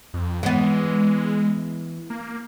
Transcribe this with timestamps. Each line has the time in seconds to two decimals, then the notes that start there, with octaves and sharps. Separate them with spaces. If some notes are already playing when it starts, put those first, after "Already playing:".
0.14 F2
0.43 E3 G#3 B3
2.10 A#3